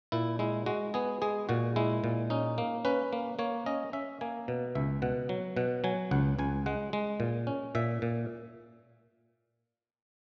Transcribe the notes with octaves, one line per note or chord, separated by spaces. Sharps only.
A#2 E4
G#3 E4
G#3 F#4
B3 G#4
G#3 G#4
A#2 F#4
G#3 E4
A#2
C#4 D#4
A#3
C#4 B4
A#3
A#3 C#5
C#4 D#5
C#4 E5
A#3 G#5
B2
C#2 E5
B2 F#5
F#3
B2 F#5
F#3 G#5
C#2 F#5
C#2 G#5
G#3 F#5
G#3
A#2
C#4
A#2 E5
A#2